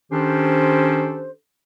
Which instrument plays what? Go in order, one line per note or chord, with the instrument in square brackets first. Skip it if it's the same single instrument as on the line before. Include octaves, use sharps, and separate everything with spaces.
[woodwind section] D#3 C#4 D4 G4 A4 C5